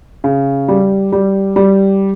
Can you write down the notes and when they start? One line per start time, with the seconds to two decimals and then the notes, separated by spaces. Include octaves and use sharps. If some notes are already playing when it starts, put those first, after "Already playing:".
0.24 C#3
0.68 G3
1.12 G3
1.56 G3